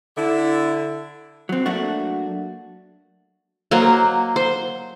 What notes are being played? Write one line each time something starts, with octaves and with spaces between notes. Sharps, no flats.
D3 E4
F#3 C4
F#3 A3 A#3 D4 F#4
F#3 A#3 C5 D#5
C5